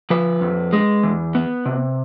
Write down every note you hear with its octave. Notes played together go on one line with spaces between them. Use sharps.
F3 B4
F2
G#3
E2
B3
C3